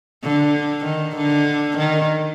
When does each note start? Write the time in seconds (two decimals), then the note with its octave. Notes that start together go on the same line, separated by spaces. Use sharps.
0.23 D3
0.84 D#3
1.16 D3
1.77 D#3